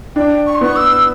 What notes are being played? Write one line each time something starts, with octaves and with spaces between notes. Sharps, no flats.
D4 G5
C#6
C6
B3 C#6
E6